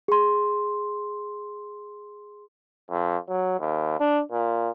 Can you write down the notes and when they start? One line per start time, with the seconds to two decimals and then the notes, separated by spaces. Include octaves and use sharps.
0.08 G#4 C6
2.91 F2
3.28 F#3
3.60 D#2
4.00 D4
4.32 A#2